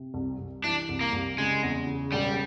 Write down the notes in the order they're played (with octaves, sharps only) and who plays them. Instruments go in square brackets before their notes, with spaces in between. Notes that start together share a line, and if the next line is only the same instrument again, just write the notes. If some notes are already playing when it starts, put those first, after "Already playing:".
Already playing: [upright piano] C3
C2
C2
[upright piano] E3 [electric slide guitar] D4
[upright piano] C2
[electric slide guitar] A#3
[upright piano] C2
[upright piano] C#3 [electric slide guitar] G#3
[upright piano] E2
C#3
[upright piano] E1 [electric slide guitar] G3